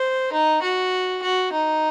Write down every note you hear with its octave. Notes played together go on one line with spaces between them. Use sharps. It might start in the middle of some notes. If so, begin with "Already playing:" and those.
Already playing: C5
D#4
F#4
F#4
D#4